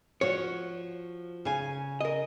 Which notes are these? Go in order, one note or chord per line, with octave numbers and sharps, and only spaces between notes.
F3 F#4 C#5
C#3 G#5
A#4 D#5